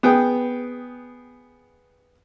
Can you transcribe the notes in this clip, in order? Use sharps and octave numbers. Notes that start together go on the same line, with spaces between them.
B3 G#4 G5